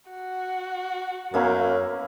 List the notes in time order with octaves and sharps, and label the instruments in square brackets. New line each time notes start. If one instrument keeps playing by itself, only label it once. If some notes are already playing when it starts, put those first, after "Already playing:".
[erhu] F#4
[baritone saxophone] F#2 [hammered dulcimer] A#3 C#4 E4 [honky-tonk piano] B3 A#4 F5